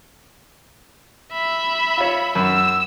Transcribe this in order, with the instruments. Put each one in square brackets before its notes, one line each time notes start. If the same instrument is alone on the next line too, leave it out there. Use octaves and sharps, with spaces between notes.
[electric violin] E5 B5
[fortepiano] F4 C#5
[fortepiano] F#2 B5 [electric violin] E6